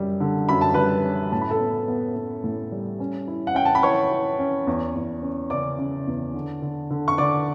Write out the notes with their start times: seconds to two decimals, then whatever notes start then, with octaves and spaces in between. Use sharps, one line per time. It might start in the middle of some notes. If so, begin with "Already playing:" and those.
Already playing: F#2 G3
0.20 D3
0.49 F#2 B5
0.61 A5
0.74 G3 B4 B5
1.04 C#4
1.32 A2 A5
1.41 B5
1.50 A4 A5
1.60 B3
1.88 B3
2.16 B3
2.44 A2
2.72 G3
3.00 C#4
3.28 E4
3.47 F#5
3.55 C#4 G5
3.65 A5
3.75 B5
3.83 E4 C#5 C#6
4.11 E4
4.39 C#4
4.67 E2
4.96 E2
5.22 C#4
5.50 C#3 D5 D6
5.79 C#3
6.07 E2
6.34 D3
6.62 D3
6.90 D3
7.08 C#6
7.18 D3 D5 D6